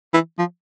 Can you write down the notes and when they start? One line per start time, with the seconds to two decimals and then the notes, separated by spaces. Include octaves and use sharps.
0.14 E3
0.39 F3